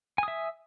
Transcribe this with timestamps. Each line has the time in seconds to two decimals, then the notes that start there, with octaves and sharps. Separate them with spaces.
0.18 G#5
0.23 D#6
0.28 E5